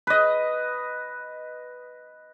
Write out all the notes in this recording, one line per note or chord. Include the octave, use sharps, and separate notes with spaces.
B4 D#5